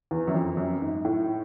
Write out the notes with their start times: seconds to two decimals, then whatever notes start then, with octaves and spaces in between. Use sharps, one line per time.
0.11 E2
0.28 F#2
0.34 F2
0.57 F#2
0.81 G#2
1.05 A2